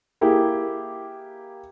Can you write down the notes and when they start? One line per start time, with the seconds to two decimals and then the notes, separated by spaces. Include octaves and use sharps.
0.21 A#3 E4 G4 G#4 F5